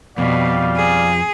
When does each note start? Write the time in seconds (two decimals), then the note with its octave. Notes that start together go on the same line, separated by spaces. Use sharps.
0.18 F2 B2 G3 D5 F5
0.76 G#4